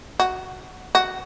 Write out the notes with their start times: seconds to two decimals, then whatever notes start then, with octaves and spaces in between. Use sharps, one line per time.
0.20 F#4
0.95 F#4